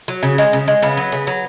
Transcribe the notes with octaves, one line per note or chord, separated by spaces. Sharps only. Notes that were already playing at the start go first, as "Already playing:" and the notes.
F#3
C#3
G#3
C#3
G#3
C#3 B3
F#3
C#3
F#3